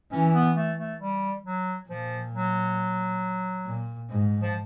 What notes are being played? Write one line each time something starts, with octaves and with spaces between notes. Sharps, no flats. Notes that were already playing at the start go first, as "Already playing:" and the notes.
E3 C#4
B3
A3
A3
G3
F#3
A#2 F3
F#3
A#2
G#2
F3